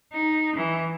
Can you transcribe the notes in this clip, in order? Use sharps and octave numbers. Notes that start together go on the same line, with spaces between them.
D#4
E3